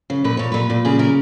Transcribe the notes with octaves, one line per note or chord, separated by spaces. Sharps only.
C#3
A#2 B4
A#2 C#5
A#2 B4
A#2
C#3 G#4
C#3 A#4